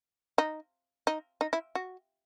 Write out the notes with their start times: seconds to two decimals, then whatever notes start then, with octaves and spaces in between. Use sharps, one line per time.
0.38 D#4
1.07 D#4
1.41 D#4
1.53 E4
1.75 F#4